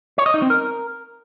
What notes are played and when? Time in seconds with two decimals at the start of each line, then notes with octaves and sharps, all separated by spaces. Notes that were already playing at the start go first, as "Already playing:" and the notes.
0.18 C#5
0.26 D#5
0.34 D#4
0.42 C4
0.50 A#4